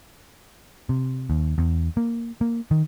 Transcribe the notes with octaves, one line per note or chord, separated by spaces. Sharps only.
C3
D#2
E2
A#3
A#3
D#3